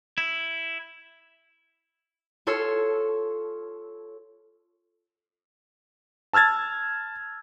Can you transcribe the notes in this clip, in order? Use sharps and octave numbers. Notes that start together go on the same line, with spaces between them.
E4
F4 A4 C#5 C6 E6
A5 E6 F6 G#6 A6